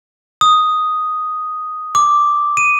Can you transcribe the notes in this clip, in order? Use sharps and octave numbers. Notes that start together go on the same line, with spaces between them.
D#6
D6
D#7